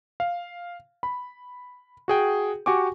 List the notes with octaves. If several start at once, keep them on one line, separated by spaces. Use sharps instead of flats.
F5
B5
F#4 G#4 G5
F#4 G4 G#5 C#6 D6